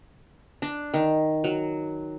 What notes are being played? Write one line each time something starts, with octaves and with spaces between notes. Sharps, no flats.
D4
D#3
F#3